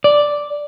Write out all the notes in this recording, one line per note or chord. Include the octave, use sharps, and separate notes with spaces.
D5